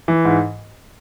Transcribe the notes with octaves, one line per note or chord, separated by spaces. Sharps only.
E3
G#2